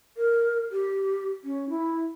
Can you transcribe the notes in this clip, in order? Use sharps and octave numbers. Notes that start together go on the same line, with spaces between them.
A#4
G4
C#4
E4